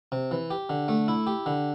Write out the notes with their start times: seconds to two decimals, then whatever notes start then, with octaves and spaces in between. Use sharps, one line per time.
0.12 C3
0.31 E3
0.51 G4
0.69 D3
0.88 A3
1.08 E4
1.27 G4
1.46 D3